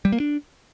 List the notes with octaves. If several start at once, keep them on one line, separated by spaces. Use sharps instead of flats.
G3
A#3
D4